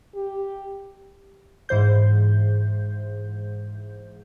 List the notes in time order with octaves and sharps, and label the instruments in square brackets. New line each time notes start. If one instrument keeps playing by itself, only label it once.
[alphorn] G4
[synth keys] G#2 E3 C5 G6